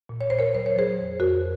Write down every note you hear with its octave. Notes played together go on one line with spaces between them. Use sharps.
A#2
C#5
A#2 C5
A#4 C#5
F#3 C5
C#5
F#3 G#4 C5
F2
F2 F#4 A#4